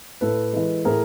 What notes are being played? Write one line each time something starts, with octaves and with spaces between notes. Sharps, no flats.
A2 A4 B4
E3 G#3
A2 G#4 A#4